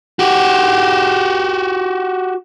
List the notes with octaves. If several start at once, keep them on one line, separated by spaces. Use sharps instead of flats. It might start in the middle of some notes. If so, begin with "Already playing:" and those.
F#4 G4